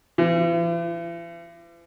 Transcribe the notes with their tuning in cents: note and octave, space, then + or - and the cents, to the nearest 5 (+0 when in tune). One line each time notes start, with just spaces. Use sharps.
E3 +45